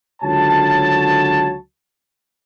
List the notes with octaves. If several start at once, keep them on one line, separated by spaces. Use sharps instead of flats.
C#2 D3 F#3 C#5 A5